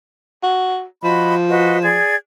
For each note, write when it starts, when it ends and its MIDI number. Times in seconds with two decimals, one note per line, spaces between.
0.43 0.84 66
1.04 1.98 53
1.04 1.34 66
1.04 1.34 75
1.04 1.34 83
1.49 1.80 66
1.49 1.80 71
1.49 1.80 75
1.82 2.16 68
1.82 2.16 74
1.82 2.16 92